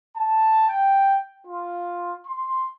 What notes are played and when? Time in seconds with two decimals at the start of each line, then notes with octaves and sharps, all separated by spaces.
0.15 A5
0.67 G5
1.45 F4
2.26 C6